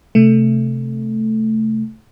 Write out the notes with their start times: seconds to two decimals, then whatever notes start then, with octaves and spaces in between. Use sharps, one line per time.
0.15 C3 A3